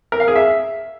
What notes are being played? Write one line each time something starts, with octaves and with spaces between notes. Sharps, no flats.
A#4
F5
G#4
E5